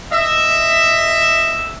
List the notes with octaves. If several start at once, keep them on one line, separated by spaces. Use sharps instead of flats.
D#5 E5